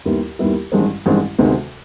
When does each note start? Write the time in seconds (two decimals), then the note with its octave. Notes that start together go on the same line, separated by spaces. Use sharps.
0.05 D#2 D#3 G3 B3 E4
0.39 D#2 D#3 G3 B3 E4
0.72 A1 G2 D#3 G#3 C4
1.06 A1 G2 D#3 G#3 C4
1.38 D2 C3 D#3 G#3 B3